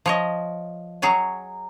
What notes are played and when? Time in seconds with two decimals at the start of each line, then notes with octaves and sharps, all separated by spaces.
0.06 F3 C#5 D#5
1.02 F#3 G#4 C#5 G#5